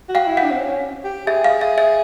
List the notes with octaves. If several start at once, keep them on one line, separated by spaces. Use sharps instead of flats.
F#4
F5 G5
E4
F#5
D4
C4
C#4
G4
G#4 E5
F5
E5
E5